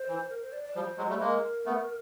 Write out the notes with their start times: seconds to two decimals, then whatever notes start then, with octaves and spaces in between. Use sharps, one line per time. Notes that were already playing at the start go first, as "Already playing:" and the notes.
Already playing: C5
0.08 E3
0.30 A#4
0.41 C5
0.52 D5
0.65 D5
0.75 F3 G3 C5
0.98 F#3 G#3
1.10 G3 A3
1.21 G#3 A#3 A#4
1.66 A3 B3